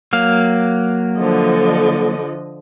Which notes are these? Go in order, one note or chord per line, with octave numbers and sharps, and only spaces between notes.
F#3 A#3 F5
D3 F3 D#5